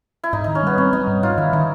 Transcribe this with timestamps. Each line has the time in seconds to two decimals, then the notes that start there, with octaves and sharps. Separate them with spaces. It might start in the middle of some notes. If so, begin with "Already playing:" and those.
0.23 E4
0.33 G#2 D#4
0.44 D#3 D#4
0.55 C#4
0.63 G3 B3
0.78 C4 C#4
0.93 G3 D#4
1.07 G#2
1.23 G#2 D#4 F4
1.38 D#3 E4
1.53 D#3 D#4